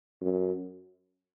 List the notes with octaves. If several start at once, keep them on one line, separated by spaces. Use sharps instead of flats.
F#2